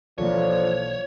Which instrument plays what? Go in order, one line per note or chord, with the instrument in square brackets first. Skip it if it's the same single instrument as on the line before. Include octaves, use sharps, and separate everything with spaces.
[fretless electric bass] B1 E3 A#3 [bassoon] D3 [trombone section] F3 [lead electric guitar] C#5